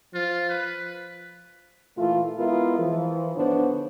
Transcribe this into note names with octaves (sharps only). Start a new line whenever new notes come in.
F3 F4
B4
A#2 E3 A3 F4
G#3 B3 E4 F4 A#4
E3 F3
G#2 D3 B3 D4 C5 C#5